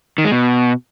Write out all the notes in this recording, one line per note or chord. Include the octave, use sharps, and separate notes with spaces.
D#3
G#3
B2